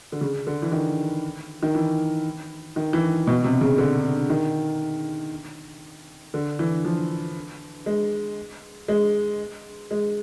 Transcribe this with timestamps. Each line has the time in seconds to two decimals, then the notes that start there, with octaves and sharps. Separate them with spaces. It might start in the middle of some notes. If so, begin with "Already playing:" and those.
0.12 D3
0.21 C#3
0.47 D3
0.62 E3
0.72 D#3
1.63 D#3
1.75 E3
2.76 D#3
2.93 E3
3.27 B2
3.44 C3
3.61 C#3
3.78 D3
4.30 D#3
6.34 D3
6.59 E3
6.84 F3
7.86 G#3
8.88 G#3
9.91 G#3